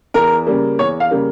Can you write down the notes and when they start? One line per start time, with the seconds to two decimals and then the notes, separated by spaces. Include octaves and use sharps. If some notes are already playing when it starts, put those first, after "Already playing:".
0.14 E2 A#4
0.47 C#3 G3 A#3
0.79 E2 C#5
1.00 F5
1.11 C#3 G3 A#3